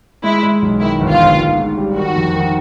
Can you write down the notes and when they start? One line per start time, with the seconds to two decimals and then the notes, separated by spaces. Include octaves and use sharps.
0.24 G#3 E4
0.43 G#3
0.62 B1
0.82 D#3 E4
1.01 G1
1.11 F4
1.20 G1
1.39 G#2
1.58 G#2
1.77 G3
1.97 D#3 F#4
2.16 F2
2.36 D#3